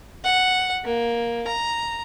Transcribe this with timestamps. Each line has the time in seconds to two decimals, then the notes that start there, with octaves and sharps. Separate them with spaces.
0.25 F#5
0.85 A#3
1.47 A#5